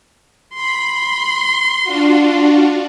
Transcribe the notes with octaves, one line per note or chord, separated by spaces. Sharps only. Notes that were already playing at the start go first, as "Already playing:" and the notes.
B5 C6
D4 F4 F#4